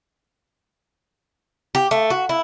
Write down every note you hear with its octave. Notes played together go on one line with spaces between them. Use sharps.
G4
A3
F#4
E4